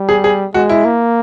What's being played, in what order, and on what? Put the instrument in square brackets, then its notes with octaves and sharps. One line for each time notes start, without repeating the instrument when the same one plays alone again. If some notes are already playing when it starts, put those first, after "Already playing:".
Already playing: [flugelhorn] G3
[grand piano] G#4
G#4
[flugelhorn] G#3 [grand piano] F#4
[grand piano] E4
[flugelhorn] A#3